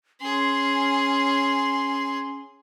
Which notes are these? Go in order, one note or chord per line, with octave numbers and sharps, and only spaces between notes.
C#4 G#4 C6